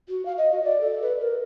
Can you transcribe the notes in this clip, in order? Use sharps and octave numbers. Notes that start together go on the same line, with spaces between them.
F#4
F5
D#5
F#4
D5
A4
B4
A#4